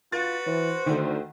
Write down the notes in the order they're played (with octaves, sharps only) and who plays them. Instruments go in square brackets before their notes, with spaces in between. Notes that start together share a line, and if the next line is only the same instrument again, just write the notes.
[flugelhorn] F4 [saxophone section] F#4 B4 [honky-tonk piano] A6
[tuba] E3 [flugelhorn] C5
[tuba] D2 [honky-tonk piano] D3 D#3